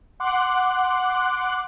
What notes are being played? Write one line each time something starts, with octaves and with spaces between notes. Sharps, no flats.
F#5 C6 D6 F#6